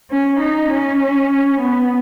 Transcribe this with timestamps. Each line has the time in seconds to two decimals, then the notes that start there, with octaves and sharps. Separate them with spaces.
0.11 C#4
0.41 D#4
0.71 C#4
1.61 B3